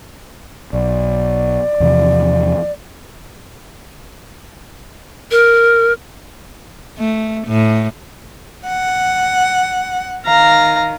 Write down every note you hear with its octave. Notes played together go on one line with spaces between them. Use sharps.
B1 D5
E2 C3 F3
A#4
A3
A2
F#5
D#3 F5 A#5